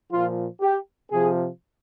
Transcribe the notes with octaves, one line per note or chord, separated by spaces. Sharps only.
A#2 F3 F4
G4
C3 F3 G#4